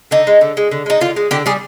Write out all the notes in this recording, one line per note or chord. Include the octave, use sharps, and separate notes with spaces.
D3 D#4
G#3
D3
G#3
D3
G#3 D#4
D3 F4
G#3
D3 G4
G3 G#4